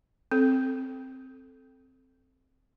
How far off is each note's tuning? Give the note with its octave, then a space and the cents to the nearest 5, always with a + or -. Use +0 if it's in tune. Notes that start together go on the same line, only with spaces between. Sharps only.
C4 +0 A4 +0